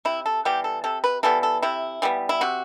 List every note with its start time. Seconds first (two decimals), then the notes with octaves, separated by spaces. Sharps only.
0.05 C3 E4
0.26 A4
0.45 E3 G3 B3 G4
0.64 A4
0.84 C3 A4
1.04 B4
1.23 E3 G3 B3 A4
1.43 A4
1.62 C3 E4
2.02 E3 G3 B3
2.29 E4
2.41 C3 F#4